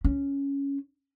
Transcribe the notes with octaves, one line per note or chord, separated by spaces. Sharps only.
C#4